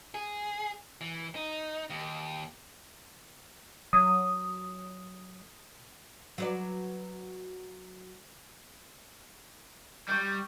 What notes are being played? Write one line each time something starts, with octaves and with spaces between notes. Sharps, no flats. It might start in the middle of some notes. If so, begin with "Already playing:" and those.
G#4
E3
D#4
D#2
F#3 D#6
F#3 B4 D5
G3 C#6 G6